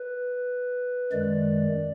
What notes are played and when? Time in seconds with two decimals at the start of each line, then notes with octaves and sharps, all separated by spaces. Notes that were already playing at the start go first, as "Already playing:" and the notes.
Already playing: B4
1.12 F#2 D#3 G#3 D5